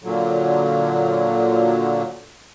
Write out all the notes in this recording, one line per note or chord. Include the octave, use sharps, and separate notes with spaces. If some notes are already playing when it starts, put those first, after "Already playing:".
A#2 D3 F#3